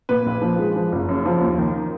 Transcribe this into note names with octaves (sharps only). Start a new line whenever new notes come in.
A#2 B4
A#1
F3
G#3
F3
F#1
F#2
F3
D#2
D#3